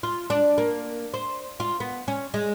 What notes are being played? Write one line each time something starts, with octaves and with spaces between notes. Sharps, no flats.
F4
D4
A#3
C5
F4
B3
C#4
G#3